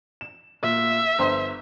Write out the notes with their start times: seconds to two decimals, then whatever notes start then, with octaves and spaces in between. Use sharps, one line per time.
0.21 E7
0.63 A#2 E5
1.19 G1 C5 C6